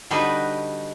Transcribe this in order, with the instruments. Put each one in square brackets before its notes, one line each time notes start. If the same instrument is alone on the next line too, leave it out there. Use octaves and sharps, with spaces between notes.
[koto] D3 G3 D#4 F#4 B4